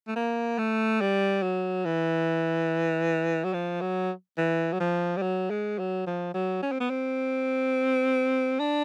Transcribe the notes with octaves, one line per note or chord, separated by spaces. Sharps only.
A3
A#3
A3
G3
F#3
E3
F#3
F3
F#3
E3
F#3
F3
G3
F#3
G#3
F#3
F3
F#3
C#4
C4
B3
C4
D4